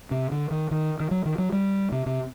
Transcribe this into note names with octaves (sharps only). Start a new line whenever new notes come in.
C3
D3
D#3
D#3
D#3
F#3
D#3
F#3
G3
C3
C3